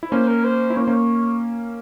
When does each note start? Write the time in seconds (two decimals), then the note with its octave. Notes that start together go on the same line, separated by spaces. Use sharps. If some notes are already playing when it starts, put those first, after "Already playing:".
0.03 E4
0.11 A#3 C#4 C5
0.28 A#4
0.45 C5
0.70 E4
0.76 A#3 C#4 C#5
0.84 C5
0.87 A#3 C#4
0.93 C#5